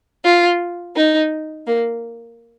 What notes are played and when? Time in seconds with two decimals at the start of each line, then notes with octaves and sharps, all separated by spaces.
0.24 F4
0.96 D#4
1.67 A#3